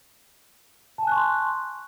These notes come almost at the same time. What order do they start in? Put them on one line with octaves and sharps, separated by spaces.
A5 G#5 F#6 C#6 C6